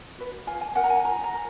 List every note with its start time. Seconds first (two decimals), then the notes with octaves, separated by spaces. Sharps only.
0.18 F#4 B4
0.47 F4 G#5
0.61 G#5
0.75 A#4 F#5
0.84 A#5
0.90 G#5
1.04 F4 A#5
1.24 A#5
1.33 A#4